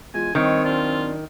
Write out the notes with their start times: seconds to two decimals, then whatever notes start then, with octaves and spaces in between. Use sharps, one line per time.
0.14 E2 G#3 F4 G#5
0.35 G2 D#3 C4 C#5 D#5
0.65 F#3 D4 F4